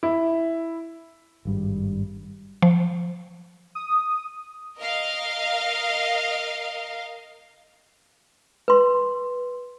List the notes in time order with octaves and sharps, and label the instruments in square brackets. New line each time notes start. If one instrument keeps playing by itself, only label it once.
[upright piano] E4
[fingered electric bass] G#1 G2 G3
[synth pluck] F3
[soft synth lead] D#6
[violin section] A#4 D#5 F5
[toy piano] B4 C6